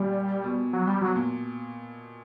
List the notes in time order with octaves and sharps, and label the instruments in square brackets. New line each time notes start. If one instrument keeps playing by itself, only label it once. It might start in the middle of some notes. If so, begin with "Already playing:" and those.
Already playing: [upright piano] A#2 [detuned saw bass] G3
[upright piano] B2
[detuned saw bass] F#3
G3
[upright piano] B2 [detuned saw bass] F#3
[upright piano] A#2